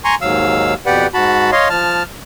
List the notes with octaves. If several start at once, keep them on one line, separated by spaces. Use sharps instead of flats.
G#5 A#5 C6 C#6
D#2 G#2 F#3 F5 E6
F2 B2 G4 B4 D5 F#5
G#2 F#4 A5 B5
C#5 D#5 F5 C6
F3 A5 F6